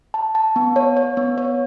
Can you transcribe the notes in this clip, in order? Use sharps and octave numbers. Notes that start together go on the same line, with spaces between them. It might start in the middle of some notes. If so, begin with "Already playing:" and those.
A5
A5
B3
C#5
C#5
B3
C#5